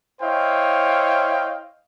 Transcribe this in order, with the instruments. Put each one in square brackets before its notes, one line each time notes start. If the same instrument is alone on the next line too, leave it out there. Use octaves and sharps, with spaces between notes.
[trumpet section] E4 C5 C#5 D#5 F5 G5